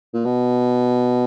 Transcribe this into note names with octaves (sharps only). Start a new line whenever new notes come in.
A#2
B2